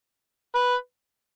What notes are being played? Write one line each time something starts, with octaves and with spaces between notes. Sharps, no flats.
B4